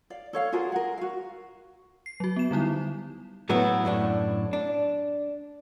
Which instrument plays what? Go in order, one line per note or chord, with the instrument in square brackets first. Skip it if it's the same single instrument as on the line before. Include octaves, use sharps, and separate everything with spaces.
[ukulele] D5 F5
A4 C#5 F5
F4 F#4 G#4 A#4
A#4 F#5
F#4 F5
[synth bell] C7
F#3 F#4
B3 E7
D3 G3 D#4 E4
[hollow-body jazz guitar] A2 F#3 A3 B3 E4
F#2 A2 D4
D4